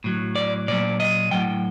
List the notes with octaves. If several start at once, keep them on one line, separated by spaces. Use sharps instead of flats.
A2 F#3
D5
A#2 F#3 D5
D#5
A2 F#3 G5